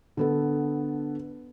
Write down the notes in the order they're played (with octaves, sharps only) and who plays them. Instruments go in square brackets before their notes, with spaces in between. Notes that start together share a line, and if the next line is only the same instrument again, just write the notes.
[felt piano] D3 B3 A4